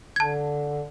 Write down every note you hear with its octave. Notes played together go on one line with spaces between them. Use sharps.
D3 A5 G#6